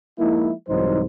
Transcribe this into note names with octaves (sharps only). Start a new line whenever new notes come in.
F3 G#3 A#3 D#4 E4
C2 G#2 E3 F#3 D#4 C5